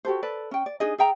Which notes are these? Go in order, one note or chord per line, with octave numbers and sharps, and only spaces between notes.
F#4 G4 A4 C5
A4 B4 D5
C#4 G5
D5
D4 D#4 G#4 D#5
G#4 E5 G5 A#5